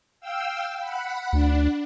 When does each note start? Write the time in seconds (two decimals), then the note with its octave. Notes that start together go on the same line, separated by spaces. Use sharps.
0.20 F5 G5 E6
0.79 F#5 B5
1.33 D2 D4